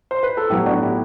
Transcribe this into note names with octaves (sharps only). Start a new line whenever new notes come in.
C5
B4
A4
A2 F#3 B3 E4 G4
D4 F#4
E4 G4